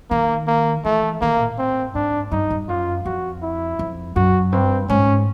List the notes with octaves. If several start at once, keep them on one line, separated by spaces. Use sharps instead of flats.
D#3 A#3
A#3
E3 A3
D#3 A#3
A2
C4
G#2 D4
G2 D#4
G2
F#2 F4
F2 F#4
E4
F2
F#2 F#4
G2 C4
G#2 C#4